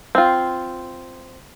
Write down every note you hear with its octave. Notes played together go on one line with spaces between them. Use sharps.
C4 F4